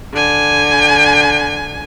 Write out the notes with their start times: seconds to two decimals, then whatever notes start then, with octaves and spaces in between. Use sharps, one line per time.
0.13 D3 G#5